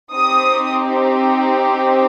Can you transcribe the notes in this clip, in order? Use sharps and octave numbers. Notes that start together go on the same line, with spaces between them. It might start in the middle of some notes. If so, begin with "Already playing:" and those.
C4 D#4 G4 D#6